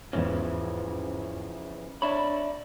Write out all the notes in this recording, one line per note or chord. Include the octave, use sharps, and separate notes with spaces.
E2 G#2 C#3 E3 F3 C#4
D4 C#5 D5 E5 B5